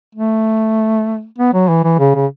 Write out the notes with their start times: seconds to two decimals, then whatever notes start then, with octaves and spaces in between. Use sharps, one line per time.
0.15 A3
1.38 B3
1.54 F#3
1.69 E3
1.84 E3
1.99 C#3
2.15 C#3